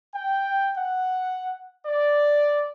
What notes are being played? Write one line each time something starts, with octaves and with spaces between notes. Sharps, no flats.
G5
F#5
D5